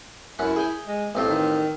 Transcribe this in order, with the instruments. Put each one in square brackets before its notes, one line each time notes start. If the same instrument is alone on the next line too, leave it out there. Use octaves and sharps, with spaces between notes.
[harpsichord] F#2 C#4 F#5 [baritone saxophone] E4
[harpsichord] G#4 G5 G#5
[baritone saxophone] G#3
[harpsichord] A1 C4 F4 [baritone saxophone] A3
[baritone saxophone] D#3